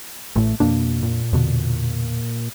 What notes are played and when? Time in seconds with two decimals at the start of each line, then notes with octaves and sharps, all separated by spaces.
0.36 A1 A2 A3
0.60 F2 B2 A#3 D4
1.03 A#2
1.33 E2 B2 D3